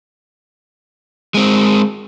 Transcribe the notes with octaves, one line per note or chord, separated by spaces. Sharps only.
G#3 C4